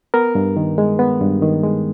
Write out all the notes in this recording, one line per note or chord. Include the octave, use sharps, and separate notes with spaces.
B3 A#4
G2
D#3
G#3
B3
G2
D#3
G#3